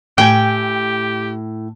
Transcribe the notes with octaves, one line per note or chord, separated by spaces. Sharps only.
A2 G4 G5 G#5